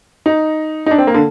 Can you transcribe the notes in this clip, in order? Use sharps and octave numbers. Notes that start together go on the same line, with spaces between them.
D#4
D#4
D4
C4
A#3
D3